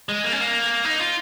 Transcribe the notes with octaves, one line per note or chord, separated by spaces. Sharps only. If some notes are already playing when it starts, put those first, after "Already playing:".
G#3
A#3
C#4
A#3
D#4
F4